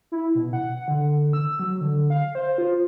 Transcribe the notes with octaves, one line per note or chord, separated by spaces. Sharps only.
E4
B2
F#5
D3
E6
F#3
D3
F5
C5
F4